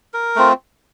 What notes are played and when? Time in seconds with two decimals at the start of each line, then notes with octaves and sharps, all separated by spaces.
0.14 A#4
0.36 A3 C4 F4